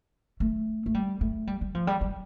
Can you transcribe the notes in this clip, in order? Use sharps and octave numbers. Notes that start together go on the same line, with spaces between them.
A3
A3
G3
A3
G3
G3
F3
G3
G3